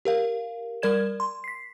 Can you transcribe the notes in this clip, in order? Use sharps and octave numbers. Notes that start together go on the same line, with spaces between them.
G4 A#4 F5
G3 A#4 D5 G#6 E7
C6
B6 C7